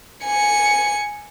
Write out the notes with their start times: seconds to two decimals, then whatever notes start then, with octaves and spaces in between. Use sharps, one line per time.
0.24 G#5 C#7